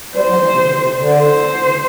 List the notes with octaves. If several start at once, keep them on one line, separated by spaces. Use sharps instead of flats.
G3 C5
F#3
E3
C3
D3
C3
D3
C5
D3